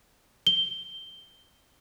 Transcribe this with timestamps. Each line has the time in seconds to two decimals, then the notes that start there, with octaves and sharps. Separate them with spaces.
0.47 G7